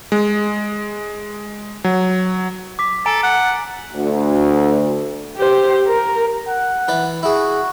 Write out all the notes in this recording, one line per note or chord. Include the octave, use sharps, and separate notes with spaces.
G#3
F#3
D6 B6
A4 G#5 A#5 D7
F#5
D2
G4 C5
A#4
F#5
E3 B4 D5
E4 F#4 G#4